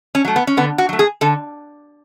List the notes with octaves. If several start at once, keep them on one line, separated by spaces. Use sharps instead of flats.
C#4
F#3 A3
B3
C#4
D3 B3
F#4
F#3 A3
G#4
D3 A4